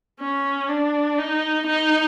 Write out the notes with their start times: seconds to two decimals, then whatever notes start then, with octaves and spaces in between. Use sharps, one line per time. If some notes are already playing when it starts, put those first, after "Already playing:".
0.20 C#4
0.68 D4
1.18 D#4
1.67 D#4